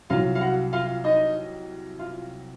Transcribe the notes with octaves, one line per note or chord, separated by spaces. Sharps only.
C2 C3 F#3 F4 F5
F5
F#4 F#5
F4 F5
D#4 D#5
F4 F5